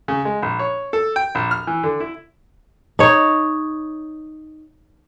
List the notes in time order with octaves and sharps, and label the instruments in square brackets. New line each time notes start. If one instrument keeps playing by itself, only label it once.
[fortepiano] C#3
G#3
A#1
C#5
A4
G5
A#1
F6
E3
D3
E4
[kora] D#4 C#5